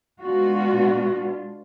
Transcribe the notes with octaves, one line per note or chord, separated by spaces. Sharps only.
B2 G#3 B3 D4 F4 F#4